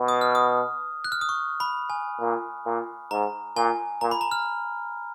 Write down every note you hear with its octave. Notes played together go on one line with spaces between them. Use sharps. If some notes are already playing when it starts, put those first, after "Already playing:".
Already playing: B2
D#6
F6
D#6
F#6
F6
D#6
C#6
B5
G#5
A#2
A#2
G#2 A#5
A#2 G#5
A#2 A#5
B5
A#5
F6